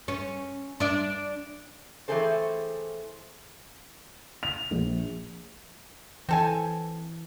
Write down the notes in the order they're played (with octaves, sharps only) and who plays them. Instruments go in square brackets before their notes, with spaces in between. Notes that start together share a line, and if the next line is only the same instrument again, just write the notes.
[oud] C#4
D4 D5
[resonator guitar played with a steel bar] E3 A3 C4 G#4 A4 C5
[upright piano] F7
A#1
[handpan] E3 [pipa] C4 A4 G#5